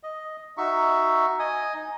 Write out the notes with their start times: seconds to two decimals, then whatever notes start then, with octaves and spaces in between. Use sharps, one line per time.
0.03 D#5
0.57 D#4 F#4 E5 C#6
1.39 D#5 G#5 D#6
1.74 D#4